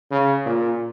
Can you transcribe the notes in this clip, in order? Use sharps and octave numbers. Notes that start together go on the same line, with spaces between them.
C#3
A#2